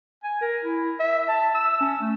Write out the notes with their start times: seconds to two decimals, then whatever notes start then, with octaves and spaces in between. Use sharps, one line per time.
0.24 G#5
0.41 A#4
0.64 E4
1.00 E5
1.29 A5
1.55 E6
1.81 C#4
2.01 A3